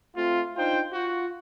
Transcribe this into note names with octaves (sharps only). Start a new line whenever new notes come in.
A3 C4 F4
D4 D#4 F4 C5 G5
F4 F#4